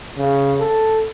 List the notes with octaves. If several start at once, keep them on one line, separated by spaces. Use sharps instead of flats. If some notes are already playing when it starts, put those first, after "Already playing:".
C#3
A4